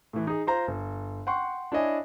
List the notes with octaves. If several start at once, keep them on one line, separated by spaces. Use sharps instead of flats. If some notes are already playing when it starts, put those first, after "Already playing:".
A2 E3
D#4 G#4
F4 C5 A#5
G1
F#5 G5 C6 C#6
D4 E4 C#5 D#5 G#5